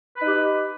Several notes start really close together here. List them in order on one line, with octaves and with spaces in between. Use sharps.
B4 D#4 G4